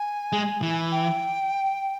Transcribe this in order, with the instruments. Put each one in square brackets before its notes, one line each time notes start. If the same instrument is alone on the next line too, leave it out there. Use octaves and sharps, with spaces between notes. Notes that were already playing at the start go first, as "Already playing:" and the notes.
Already playing: [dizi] G#5
[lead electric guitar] G#3
E3
[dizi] G5